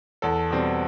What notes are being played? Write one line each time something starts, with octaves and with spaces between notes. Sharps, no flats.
E2 A4
B2 G3 C4